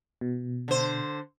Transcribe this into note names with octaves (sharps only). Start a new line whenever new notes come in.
B2
D3 C5